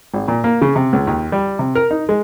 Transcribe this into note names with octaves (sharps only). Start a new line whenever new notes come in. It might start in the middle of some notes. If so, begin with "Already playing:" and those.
G#1
A#2
A#3
C#3
C3
C#2
D#2
G3
C3
A#4
D#4
G#3